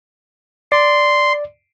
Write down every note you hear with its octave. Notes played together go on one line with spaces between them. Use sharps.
D5 C6